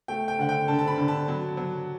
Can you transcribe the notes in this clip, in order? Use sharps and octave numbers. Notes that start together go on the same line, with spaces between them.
A3 G5
G5
D3 F#5
G5
D3 A5
A5
B5
D3
A5
F#3
F#3